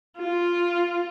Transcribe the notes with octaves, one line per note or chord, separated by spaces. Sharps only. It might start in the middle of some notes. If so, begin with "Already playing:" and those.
F4